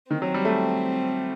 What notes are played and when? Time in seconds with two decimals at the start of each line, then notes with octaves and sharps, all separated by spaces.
0.11 D#3 C4
0.22 F#3
0.34 G3
0.45 A3